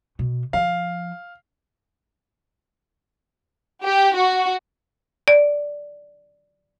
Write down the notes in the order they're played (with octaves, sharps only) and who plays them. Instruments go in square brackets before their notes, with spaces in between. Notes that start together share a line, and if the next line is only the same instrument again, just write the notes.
[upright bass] B2
[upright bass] F3 [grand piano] F5
[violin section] G4
F#4
[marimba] D5